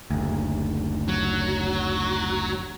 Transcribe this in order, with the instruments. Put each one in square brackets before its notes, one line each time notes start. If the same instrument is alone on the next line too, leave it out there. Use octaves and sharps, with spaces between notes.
[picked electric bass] F#1 D2
[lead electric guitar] F#3